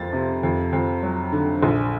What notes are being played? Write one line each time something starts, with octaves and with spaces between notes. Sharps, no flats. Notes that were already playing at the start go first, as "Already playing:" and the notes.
Already playing: F2 F3 A#3 A6
C3
F2
F2
F#3
D3
A#1